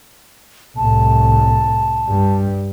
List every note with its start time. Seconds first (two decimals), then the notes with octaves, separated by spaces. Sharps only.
0.77 C2 A2 A5
2.07 G2 G3